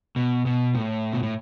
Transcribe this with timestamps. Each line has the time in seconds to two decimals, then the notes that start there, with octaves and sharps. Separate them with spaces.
0.16 B2
0.46 B2
0.75 A2
1.13 B2
1.23 A2